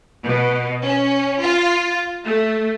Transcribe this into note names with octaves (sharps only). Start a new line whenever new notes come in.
B2
C#4
F4
A3